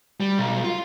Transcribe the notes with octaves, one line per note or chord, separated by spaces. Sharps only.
G3
B1
F4